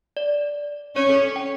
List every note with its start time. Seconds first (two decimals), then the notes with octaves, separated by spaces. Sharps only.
0.17 D5
0.95 C#4 C#5
1.09 A4
1.36 G5